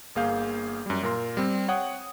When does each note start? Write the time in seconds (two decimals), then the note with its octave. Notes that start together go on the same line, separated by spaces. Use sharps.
0.16 G1 A#3 G#4 F5 G6
0.86 F#2 G3
1.03 A#2 A#4 C6
1.37 G3 C4
1.68 C#5 F#5 G5 D#6